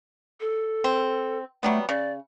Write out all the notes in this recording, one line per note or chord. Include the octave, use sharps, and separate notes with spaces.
A4
C4
F#3 G3 A3 B3
C#3 D5